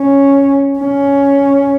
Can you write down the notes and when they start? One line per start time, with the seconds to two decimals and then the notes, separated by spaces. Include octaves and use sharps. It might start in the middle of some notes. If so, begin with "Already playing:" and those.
Already playing: C#4
0.79 C#4